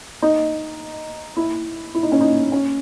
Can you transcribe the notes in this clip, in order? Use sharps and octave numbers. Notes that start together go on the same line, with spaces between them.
D#4
E4
E4
D#4
C#4
D#4
C#4